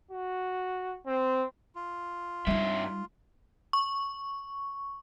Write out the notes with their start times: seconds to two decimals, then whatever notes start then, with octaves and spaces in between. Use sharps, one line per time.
0.11 F#4
1.07 C4
1.76 F4
2.47 G2 G3 D#4 E5
3.73 C#6